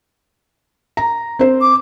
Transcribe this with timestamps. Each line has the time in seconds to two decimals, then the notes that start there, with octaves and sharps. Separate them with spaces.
0.97 A#5
1.39 C4 C5
1.61 D6